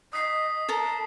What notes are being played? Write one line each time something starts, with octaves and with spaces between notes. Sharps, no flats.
D#5 D#6 B6 C7
A4 A#4 A5 A#5